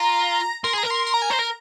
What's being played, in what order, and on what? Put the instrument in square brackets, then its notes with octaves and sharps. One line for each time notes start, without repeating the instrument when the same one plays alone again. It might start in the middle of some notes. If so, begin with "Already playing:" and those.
Already playing: [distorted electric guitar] F4 [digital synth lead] A#5
[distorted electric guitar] A#4 [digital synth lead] C6
[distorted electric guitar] G#4 [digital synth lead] A#5
[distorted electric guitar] A#4
[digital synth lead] C6
C6
A#5
G#5
[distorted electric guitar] C5 [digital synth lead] A#5
[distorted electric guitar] A#4